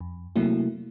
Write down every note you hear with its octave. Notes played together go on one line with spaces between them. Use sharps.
F2
C3 F#3 A3 A#3 E4